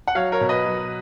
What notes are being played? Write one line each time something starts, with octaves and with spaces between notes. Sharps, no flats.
F#5
F#3 C#5 F5
A#4 C#5
B2
B4 D#5
F#3